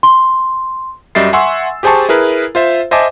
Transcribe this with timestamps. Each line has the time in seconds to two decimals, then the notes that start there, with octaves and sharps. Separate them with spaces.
0.03 C6
1.15 F#2 G3 D#5 E5 A6 C7
1.33 E5 F#5 G#5 C6 C#6 E6
1.83 G4 G#4 C5 G#5 A5 C#6
2.09 E4 G#4 A#4 B4
2.55 F4 C5 E5
2.91 C5 D#5 E5 G#5 A5 D6